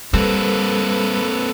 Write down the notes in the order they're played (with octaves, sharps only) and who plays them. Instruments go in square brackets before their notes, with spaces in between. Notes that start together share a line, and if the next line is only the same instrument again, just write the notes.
[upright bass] G3 [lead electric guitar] A#3 C4 [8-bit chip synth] A4 B4